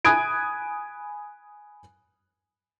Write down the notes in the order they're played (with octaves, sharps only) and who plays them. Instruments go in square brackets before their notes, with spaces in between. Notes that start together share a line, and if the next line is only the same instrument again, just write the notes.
[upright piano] G#5 B5 D#6 F#6 G#6 D7